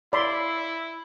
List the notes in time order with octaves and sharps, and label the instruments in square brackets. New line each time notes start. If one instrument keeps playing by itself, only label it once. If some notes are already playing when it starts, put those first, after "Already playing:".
[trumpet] E4 [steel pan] D5 B5 C6